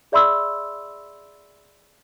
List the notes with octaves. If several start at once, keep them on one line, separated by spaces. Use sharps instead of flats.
G#4 D5 E5 B5 C6 E6